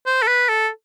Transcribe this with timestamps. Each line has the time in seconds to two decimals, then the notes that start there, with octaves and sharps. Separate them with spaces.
0.06 C5
0.22 A4
0.27 B4
0.49 A4